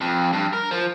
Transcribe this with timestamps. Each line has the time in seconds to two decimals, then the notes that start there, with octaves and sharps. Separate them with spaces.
0.01 F2
0.33 G2
0.53 A#4
0.71 F3